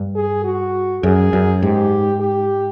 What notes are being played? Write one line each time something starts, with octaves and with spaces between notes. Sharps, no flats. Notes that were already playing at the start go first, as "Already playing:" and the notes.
Already playing: G2
G#4
F#4
F#2 G#4
F#2
G#2 G4
G4